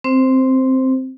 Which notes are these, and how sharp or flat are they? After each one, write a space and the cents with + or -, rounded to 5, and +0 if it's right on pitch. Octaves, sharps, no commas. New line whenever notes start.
C4 +0 C5 +0